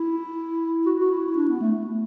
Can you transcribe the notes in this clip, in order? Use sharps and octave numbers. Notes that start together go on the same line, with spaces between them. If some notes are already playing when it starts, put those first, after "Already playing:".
Already playing: E4
F#4
F#4
E4
E4
D4
B3
A3
A3